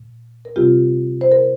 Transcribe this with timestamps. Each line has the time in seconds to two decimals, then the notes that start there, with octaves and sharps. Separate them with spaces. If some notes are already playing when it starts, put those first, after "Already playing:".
Already playing: A#2
0.45 A#4
0.56 C3 G3 C4 F4 G4
1.21 C5
1.32 A#4